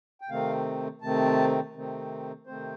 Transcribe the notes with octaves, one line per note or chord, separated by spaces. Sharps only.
G5
C3 D#3 A3 C4 F5
C3 D#3 A3 C4 A5
C3 D#3 A3 C4
C3 D#3 A3 C4 C5